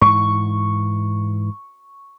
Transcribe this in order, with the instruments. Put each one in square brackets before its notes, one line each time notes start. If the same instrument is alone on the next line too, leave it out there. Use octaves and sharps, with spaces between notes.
[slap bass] G#2 E3 [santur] C#6